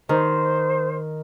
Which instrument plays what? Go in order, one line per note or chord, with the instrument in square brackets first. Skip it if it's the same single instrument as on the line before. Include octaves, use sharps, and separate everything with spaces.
[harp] D#3 [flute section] C5